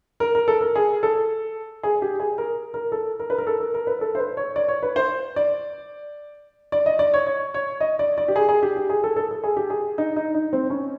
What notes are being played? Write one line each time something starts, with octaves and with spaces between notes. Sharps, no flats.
A#4
A#4
A4
A#4
G#4
A4
G#4
G4
G#4
A#4
A#4
A4
A#4
B4
A#4
A4
A#4
A#4
B4
A4
C5
B4
C#5
D5
C#5
B4
C5
D5
D5
D#5
D5
C#5
C#5
C#5
D#5
D5
D5
G4
G#4
G#4
G4
G4
G#4
A4
A4
A4
G#4
G4
G#4
D#4
D#4
D#4
C4
C#4